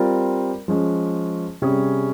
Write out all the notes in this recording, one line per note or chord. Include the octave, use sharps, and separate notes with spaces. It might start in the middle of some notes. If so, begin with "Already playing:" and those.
Already playing: G3 C4 F4 A#4
F3 G#3 C#4
C3 G3 C#4 G#4